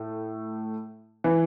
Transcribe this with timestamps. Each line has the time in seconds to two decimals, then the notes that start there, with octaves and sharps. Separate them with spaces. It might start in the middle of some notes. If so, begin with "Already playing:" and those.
Already playing: A2 A3
1.24 E3